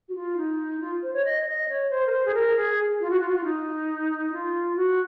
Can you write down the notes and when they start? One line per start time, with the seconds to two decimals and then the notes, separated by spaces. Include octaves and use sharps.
0.09 F#4
0.15 F4
0.37 D#4
0.80 F4
1.03 C5
1.14 C#5
1.25 D#5
1.46 D#5
1.69 C#5
1.90 C5
2.07 A#4
2.12 C5
2.26 G#4
2.34 A#4
2.56 G#4
3.01 F4
3.10 F#4
3.20 F4
3.29 F#4
3.36 F4
3.44 D#4
4.32 F4
4.76 F#4